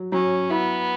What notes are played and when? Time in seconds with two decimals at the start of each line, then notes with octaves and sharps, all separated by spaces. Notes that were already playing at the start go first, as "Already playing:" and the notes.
Already playing: F#3
0.12 F#3 C#4
0.50 B3 E4